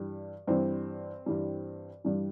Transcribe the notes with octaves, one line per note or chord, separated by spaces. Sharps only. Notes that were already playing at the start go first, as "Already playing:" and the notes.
Already playing: G2 E3 G3
G2 E3 G3 C4
G2 E3 G3
G2 E3 G3